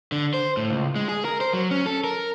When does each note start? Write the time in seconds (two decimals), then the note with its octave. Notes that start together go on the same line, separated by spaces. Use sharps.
0.12 D3
0.34 C5
0.57 A2
0.70 C#2
0.96 G#3
1.09 G#4
1.25 A#4
1.41 C5
1.53 F#3
1.71 C#4
1.86 A4
2.04 A#4